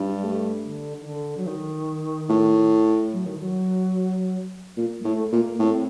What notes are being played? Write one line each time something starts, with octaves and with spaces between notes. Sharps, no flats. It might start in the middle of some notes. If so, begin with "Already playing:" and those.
Already playing: G2
G3
A3
D3
D#3
D3
F#3
D#3
A2
F#3
D#3
F#3
A#2
G3
A2 A3
A#2 A#3
A2 C4